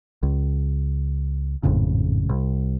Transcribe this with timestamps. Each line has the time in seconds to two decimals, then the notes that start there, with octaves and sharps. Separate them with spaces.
0.23 C#2
1.63 G#1 F2 A2 C#3
2.29 C2